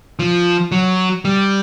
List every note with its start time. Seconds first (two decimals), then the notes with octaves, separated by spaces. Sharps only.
0.19 F3
0.72 F#3
1.25 G3